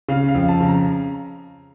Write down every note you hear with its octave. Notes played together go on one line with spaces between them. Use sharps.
C#3 F5
F5
F2
A5
C#3
A#5